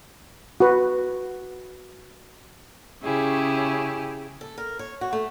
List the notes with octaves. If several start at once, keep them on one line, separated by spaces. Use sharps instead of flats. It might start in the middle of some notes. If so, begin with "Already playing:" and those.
F#4 B4
C#3 C#4 E4 G4 G#4
A4
A#4
C#5
F#4
A3